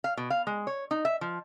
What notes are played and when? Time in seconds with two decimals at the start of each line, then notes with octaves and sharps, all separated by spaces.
0.04 F5
0.17 B2
0.30 F5
0.47 G#3
0.67 C#5
0.91 D#4
1.05 E5
1.21 F3